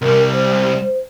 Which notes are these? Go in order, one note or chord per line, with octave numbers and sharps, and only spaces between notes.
C2 G3 A#4
C5